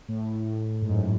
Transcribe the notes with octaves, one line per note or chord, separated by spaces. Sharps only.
A2
G#2
F#2